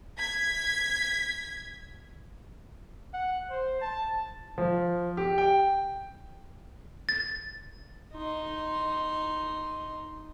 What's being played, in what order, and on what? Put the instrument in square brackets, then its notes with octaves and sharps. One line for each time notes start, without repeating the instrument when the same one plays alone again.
[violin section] G#6 B6
[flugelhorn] F#5
C5
A5
[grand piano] F3
G4
G5
[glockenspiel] A6
[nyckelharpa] D#4 C6